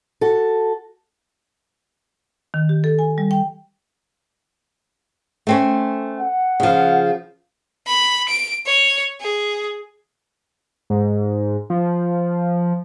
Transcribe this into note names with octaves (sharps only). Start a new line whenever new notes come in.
F#4 A4
D#3
G4
A4
G#5
G3
G5
A3 C4 C#4
F#5
C#3 F3
B5
D7
C#5
G#4
G#2
F3